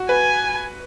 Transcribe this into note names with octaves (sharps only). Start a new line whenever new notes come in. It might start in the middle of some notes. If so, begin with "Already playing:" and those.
Already playing: F#4
B4 G#5